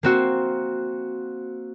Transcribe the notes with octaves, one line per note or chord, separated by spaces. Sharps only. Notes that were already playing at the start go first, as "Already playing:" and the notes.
A#3 C4 F#4